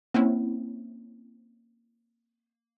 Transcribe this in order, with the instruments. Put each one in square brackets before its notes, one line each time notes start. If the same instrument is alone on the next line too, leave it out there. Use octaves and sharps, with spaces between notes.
[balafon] A#3 [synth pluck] C4 C#4 E4